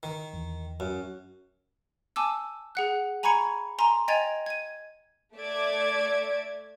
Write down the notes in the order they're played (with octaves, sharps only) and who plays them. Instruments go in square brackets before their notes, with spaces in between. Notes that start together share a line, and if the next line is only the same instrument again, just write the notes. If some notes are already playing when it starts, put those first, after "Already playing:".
[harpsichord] D#3
[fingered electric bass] E2
[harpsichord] F#2
[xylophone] G#5 A5 D6 E6
G#4 F#5 F#6
G#5 A#5 B5 C#6 G#6 C#7
G#5 A#5 C6
D#5 G5 G#5 G#6 A6 F7
G#6 D#7
[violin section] A3 D5 E5 D6 G#6